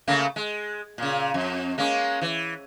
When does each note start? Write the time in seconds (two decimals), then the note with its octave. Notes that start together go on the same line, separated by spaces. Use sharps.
0.07 C#3 A3 A#3
0.36 G#3
0.98 A#2 C#3
1.34 F2
1.78 G#3 A#3 C#4
2.21 E3